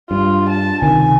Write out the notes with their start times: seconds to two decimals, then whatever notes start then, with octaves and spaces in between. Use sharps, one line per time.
0.11 G2 F4
0.50 A5
0.82 C#2 C3 D#3 G#5